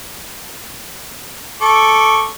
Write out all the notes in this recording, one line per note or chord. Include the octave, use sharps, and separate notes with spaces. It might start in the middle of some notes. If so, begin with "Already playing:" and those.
A4 C#6 D6